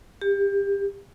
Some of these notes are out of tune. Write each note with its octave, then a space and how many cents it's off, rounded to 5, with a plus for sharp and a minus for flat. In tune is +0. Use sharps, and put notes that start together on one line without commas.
G4 +25